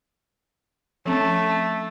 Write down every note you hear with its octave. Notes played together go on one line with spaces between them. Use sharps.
F3 A3 C4 C#4